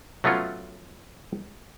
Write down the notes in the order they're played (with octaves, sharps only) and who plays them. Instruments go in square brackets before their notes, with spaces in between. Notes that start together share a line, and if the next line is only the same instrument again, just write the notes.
[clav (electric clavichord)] F#3 A3 B3 C#4 F4